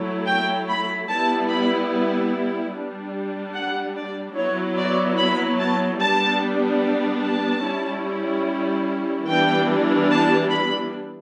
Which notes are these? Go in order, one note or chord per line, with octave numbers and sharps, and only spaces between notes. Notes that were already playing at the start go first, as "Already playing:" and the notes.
Already playing: F#3 A3 E4
G5
B5
G3 B3 E4 A5
B5
G3 D4
F#5
D5
F#3 B3 E4 C#5
D5
B5
A5
G3 B3 D4 A5
A5
G3 C#4 E4
E3 G3 B3 D4 G5
A5
B5